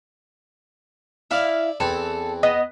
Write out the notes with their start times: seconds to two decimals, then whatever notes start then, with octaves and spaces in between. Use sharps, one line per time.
1.31 E4 D5 E5 F5
1.80 E2 E3 C4 A4
2.43 B3 D#5